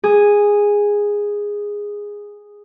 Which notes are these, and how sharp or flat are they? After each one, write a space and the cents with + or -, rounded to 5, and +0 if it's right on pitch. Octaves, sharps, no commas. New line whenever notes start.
G#4 -10